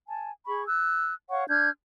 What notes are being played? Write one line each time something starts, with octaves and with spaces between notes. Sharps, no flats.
G#5 A5
G#4 B5 C#6
E6 F#6
C#5 F5 F#5 C#6
D4 F6 G6 G#6